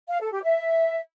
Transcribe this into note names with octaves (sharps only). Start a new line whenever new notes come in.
F5
A4
G4
E5